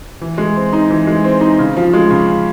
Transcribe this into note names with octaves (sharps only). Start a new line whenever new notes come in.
E3
G#3
C4
D#4
E3
G#3
C4
D#4
C#3
F3
G#3
C#3
C#3